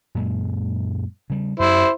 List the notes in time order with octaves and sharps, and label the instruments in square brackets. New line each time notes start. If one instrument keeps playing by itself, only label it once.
[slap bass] F#2 A#2 G#3
C#3 G3
[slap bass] F#2 [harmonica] E4 C5